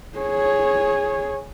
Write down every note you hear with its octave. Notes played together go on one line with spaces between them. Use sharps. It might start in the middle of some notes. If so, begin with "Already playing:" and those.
G#4 C#5